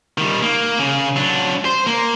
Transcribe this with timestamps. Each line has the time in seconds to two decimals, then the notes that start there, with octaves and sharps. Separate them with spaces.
0.18 D#3 G3
0.42 A#3
0.79 C#3
1.16 F#3 D4
1.65 C5
1.87 A#3